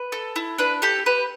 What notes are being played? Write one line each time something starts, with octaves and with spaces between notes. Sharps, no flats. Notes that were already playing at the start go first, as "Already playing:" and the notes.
Already playing: B4
A4
E4
D4 B4
G4 A4
G4 B4